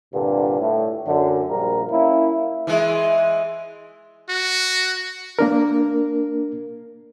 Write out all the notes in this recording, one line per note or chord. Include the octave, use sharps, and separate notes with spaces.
C2 G2 A#2 D3
A2
F#2 D3
A#1 A#2 G3 A#4
A#3 C#4 E4
E3 G#3
F#4
A#3 D4 A#4